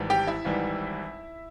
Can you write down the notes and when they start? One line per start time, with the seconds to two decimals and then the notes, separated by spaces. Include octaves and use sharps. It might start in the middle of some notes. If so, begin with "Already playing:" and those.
Already playing: G#1 G#2 E3 G3
0.10 G4 G5
0.27 E4 E5
0.45 G#1 G#2 E3 G3